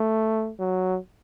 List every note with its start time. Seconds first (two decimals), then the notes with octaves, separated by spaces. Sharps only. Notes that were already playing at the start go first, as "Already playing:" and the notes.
Already playing: A3
0.59 F#3